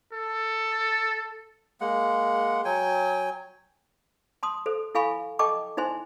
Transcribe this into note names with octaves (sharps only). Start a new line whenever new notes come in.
A4
G#3 A#3 F#5
F#3 G5 G#5
A5 C6 D#6
A4 C5
E4 A4 F5 G#5 B5 C#6
A4 D#5 G5 A5 C#6 D6
D#4 E4 C5 G#5 C6